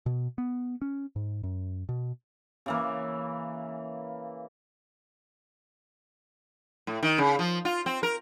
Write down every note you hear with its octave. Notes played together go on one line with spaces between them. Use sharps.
B2
B3
C#4
G#2
F#2
B2
C#3 E3 A#3
A2
D#3
C#3
F3
F4
C4
A#4